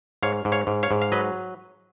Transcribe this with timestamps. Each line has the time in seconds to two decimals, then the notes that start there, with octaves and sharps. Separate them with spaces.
0.23 G#2 C#5 F5
0.45 G#2
0.52 C#5 F5
0.67 G#2
0.83 C#5 F5
0.91 G#2
1.02 F5
1.12 F#3 B4 D#5